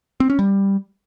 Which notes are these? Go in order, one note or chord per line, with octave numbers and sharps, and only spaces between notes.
C4
C#4
G3